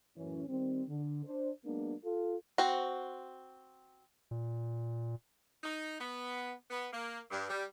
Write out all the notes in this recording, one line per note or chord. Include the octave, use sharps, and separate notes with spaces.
F#2 A2 E3 C#4
D#3 G3 C4
D3
D4 C5
F#3 G#3 A#3 B3 D4
F4 A4
C4 F#4
A#2
D#4
B3
B3
A#3
G2
G3